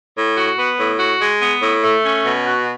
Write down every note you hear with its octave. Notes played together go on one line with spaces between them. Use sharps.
A2
F#4
B3
A2
F#4
G#3
B3
A2
A3
C#4
B2
F#4